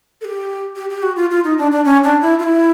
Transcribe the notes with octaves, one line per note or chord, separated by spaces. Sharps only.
A4
G4
G4
G4
F#4
F4
F4
D#4
D4
D4
C#4
D4
E4
F4
E4